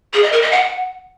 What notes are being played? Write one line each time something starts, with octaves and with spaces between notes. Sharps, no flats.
G#4
D#5
A#4
D#5
F#5